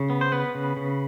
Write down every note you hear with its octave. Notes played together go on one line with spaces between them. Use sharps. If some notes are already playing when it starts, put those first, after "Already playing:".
Already playing: C#3
B3
C5
B3 B4
C#3
C#3